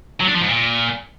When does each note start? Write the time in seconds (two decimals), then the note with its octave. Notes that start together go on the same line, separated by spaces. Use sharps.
0.20 F#3
0.27 D4
0.34 F3
0.41 G#2
0.48 A#2